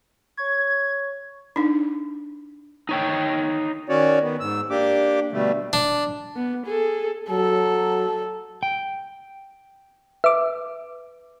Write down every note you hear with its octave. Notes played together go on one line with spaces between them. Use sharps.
C#5 C#6 G#6
D4 D#4
D#4 C#5 G5
D#3 C#4 F#4 C#5 D5
D#3 B3
G#2 E6
A#3 D4 G4 D6
B2 D3 G3 A3
D4
B3
G#4 A4
F#3 A4
G5
B4 E5 D6